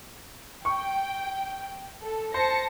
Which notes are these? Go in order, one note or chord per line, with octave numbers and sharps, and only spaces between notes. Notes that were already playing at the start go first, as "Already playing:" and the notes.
G5 C#6
A4
C5 A5 A#6 C#7